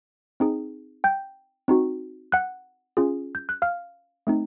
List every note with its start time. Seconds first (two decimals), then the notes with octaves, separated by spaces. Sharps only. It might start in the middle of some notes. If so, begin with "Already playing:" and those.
0.40 C4 D#4 G#4
1.04 G5 G6
1.68 C4 D#4 F#4
2.32 F#5 F#6
2.97 C#4 F4 G#4
3.35 G6
3.49 F#6
3.62 F5 F6
4.27 A3 C4 D#4